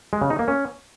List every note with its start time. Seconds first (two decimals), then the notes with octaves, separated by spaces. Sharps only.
0.13 G#3
0.22 C#3
0.30 D#4
0.39 A#3
0.48 C#4